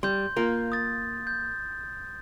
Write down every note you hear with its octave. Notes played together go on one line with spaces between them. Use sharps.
G3 C6 G6
A#3 F4 A#4
D#6 A6
G6